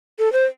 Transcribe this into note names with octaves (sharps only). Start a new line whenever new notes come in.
A4
C5